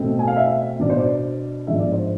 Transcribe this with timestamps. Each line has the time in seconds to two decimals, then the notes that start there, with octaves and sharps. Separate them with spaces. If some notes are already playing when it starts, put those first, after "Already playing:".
Already playing: B2 A3 C4
0.19 G#5
0.27 F5
0.36 E5
0.80 B2 B3 D4 D5
0.90 C5
0.99 D5
1.67 G#2 F3 B3 D4 E5
1.79 D5
1.92 C5